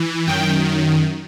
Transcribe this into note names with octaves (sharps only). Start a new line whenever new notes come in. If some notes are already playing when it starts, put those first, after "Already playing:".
Already playing: E3
F#2 D#3 G5